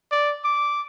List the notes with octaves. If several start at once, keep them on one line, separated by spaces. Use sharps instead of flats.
D5
D6